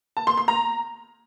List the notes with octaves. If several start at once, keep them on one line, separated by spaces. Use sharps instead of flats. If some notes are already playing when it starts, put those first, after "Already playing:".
A5
C6
C6
A#5